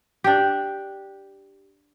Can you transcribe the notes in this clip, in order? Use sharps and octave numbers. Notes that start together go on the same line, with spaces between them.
D4 G4